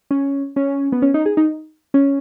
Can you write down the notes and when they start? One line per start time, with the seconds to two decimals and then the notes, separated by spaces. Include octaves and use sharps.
0.11 C#4
0.56 C#4
0.92 B3
1.02 C#4
1.14 D#4
1.26 G#4
1.37 D#4
1.94 C#4